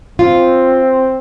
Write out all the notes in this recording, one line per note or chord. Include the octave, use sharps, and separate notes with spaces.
C4 F4